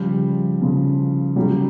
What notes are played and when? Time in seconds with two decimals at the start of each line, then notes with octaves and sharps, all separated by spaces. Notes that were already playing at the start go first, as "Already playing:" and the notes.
Already playing: C#3 F3 G3
0.61 C#3 F3
1.36 C#3 F#3 G3